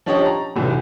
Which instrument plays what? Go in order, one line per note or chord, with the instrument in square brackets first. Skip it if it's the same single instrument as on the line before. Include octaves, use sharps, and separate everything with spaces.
[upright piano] F3 C#4 D4 G4 C#5 D#5
A#5
F1 B1 G2 E3